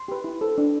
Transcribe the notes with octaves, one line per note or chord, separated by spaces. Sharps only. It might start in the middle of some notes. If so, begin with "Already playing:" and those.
Already playing: C6
G4 B4
E4
A4 C5
D4